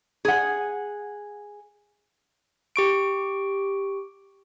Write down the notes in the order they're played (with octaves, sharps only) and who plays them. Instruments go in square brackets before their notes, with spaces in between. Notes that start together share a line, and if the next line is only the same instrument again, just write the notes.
[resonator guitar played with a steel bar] G#4 F#5
[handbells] G4 C#6 D7